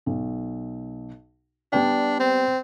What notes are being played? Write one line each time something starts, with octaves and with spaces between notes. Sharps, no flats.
B1
G3 B3 D4 G5
C4